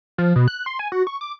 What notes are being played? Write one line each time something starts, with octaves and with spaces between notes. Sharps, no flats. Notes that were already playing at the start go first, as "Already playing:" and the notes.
F3
B2
F#6
C6
G#5
F#4
C#6
D6